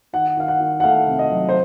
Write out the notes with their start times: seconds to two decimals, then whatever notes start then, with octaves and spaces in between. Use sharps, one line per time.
0.13 D#3 F#5
0.37 D#3 F5
0.48 F#5
0.60 D#3
0.80 F#5
0.84 A3 F5
1.07 C3
1.19 D#5
1.31 F#3
1.49 C5